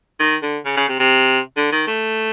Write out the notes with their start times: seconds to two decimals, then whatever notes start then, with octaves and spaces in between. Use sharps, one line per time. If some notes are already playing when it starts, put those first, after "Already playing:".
0.19 D#3
0.42 D3
0.65 C#3
0.76 C#3
0.88 C3
0.99 C3
1.57 D3
1.72 D#3
1.87 A3